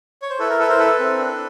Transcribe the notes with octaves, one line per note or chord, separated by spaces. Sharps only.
C#5
C5
E4 A4 B4
A#4
E4 A4 B4
A#4 C5
A4 B4
C4
D4